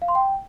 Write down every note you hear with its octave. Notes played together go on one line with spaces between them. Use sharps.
F5
C6
G5